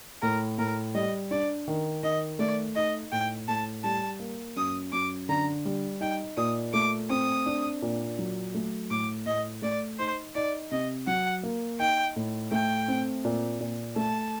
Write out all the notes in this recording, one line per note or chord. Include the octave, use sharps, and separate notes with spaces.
A2 A#4
A2 A#4
G3 D#5
D4 D5
D#3
D#3 D#5
A3 D5
D#4 D#5
A2 G5
A2 A5
G3 A5
A#3
F#2 D#6
F#2 D6
D3 A#5
G3
D#4 G5
A#2 D#6
A3 D6
C4 D#6
D4
A#2
F#3
A3
A2 D6
A2 D#5
A3 D5
D#4 C5
D#4 D5
C3 D#5
F#3 F#5
A#3
D#4 G5
A2
A3 G5
C4
A#2
A#2
A3 A5